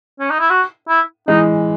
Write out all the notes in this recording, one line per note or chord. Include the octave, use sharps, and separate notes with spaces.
C#4
D#4
E4
F#4
E4
E3 G#3 D#4